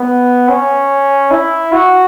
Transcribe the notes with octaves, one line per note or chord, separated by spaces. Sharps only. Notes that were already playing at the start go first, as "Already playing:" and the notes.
Already playing: B3
C#4
E4
F#4